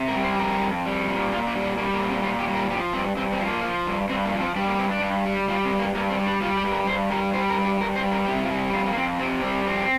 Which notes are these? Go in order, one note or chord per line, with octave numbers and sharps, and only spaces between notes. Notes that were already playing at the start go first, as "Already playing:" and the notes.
Already playing: C3
A#4
G3
C5
F2 A#4
F2
G3
A#2
A#2 F4
D4
G3
D4
G3 A#3
A#3
A#2
C4
A#2 F4
G4
G3
A#4
F3 G4
G2 C4
G2 C4
C4
F3
A#3
F3
G2
G2 C4
A#3
F3
C4
G3 D4
A#3
G2 C4
D4
G2
G3
G3 F4
C4
G2
A#3
G2 A#3
C4
G3
D4
G3 F4
G4
G2
A#4
G2 C5
G3 A#4
G3 C5
A#4
G2
G4
G2 A#4
C5
G3
A#4
C3 G4
F4
G3
F2 F4
A#3
F2 C4
C3 C4
G3 C4
F2 C4